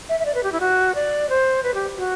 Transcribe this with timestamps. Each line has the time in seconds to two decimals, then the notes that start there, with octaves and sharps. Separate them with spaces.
0.09 E5
0.20 E5
0.26 D5
0.35 B4
0.43 G4
0.52 E4
0.60 F#4
0.95 D5
1.30 C5
1.63 B4
1.74 G4
1.97 F#4